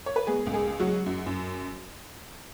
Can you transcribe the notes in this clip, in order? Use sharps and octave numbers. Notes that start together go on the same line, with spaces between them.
C#5
B4
G#3 B3 G#4
C#2
G#3 G#4
C#3
F#3 F#4
G#3
F#2
F#2